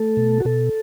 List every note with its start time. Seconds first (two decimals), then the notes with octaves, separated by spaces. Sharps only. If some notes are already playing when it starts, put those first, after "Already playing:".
Already playing: A3 A4
0.17 B2
0.40 F#4
0.45 B2 A4